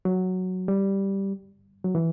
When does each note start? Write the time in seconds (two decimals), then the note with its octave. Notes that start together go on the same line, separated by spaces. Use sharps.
0.05 F#3
0.68 G3
1.84 F#3
1.95 E3